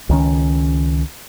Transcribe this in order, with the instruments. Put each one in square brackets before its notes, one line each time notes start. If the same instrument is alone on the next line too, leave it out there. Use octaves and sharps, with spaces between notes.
[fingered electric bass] C#2 D#3 C#4